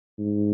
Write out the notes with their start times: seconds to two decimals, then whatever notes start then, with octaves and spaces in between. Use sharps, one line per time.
0.19 G#2